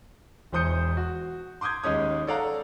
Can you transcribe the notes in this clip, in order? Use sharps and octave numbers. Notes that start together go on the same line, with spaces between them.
E1 E2 C5 D#6 G6 C#7
F#4
C6 D6 D#6 G6 G#6
D#2 G#3 C#4 D#6
A4 C#5 D5 F5 F#5 A#5